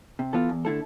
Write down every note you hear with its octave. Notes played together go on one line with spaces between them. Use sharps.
C3
E3 B3 F4 A4
E2
D3 A3 E4 A4